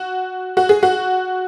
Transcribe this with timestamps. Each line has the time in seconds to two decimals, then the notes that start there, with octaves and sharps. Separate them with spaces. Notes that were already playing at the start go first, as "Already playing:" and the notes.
Already playing: F#4
0.57 F#4
0.69 G#4
0.83 F#4